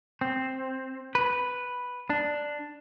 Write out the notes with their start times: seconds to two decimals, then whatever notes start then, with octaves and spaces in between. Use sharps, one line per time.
0.21 C4
1.15 B4
2.10 D4